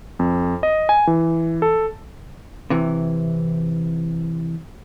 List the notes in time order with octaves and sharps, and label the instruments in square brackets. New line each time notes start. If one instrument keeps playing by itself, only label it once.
[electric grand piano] F2
D#5
G#5
E3
A4
[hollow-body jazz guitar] C3 E3